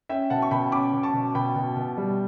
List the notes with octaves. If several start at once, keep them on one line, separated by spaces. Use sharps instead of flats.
C#4 E5 G5
B2 F#5 A5
C#6
B2 G5 B5
C#4 B5 D6
B2
A5 C#6
B2
B2 G5 B5
B2
B2
G3